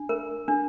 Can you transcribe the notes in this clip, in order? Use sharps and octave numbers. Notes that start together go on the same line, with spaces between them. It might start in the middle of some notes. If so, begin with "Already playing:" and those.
Already playing: D4
A#4
D4